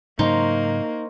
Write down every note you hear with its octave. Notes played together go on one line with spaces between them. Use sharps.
G#2 C#3 F#3 A#3 D#4 C5 D#5 C#6